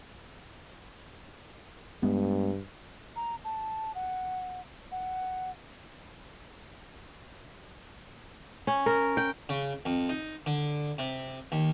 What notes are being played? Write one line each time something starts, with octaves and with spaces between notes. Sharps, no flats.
G2 G#3 B3
A#5
A5
F#5
F#5
C#4
A#4
G5
C#3
F2
D#4
D3
C3
D#2